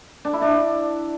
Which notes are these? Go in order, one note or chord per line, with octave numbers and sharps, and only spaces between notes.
D4
E4
D4